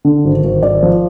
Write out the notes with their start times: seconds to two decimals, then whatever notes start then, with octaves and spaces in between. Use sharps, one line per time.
0.05 D3
0.25 G#1
0.44 G#1
0.62 G#1 D5
0.82 F3